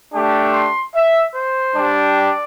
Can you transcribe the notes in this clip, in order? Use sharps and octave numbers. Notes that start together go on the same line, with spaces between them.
A3 D4 G4
C6
E5
C5
G3 D4 G4
D5